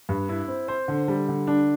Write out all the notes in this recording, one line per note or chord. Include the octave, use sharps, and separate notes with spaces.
G2
E4
C4
C5
D3
G3
D3
D4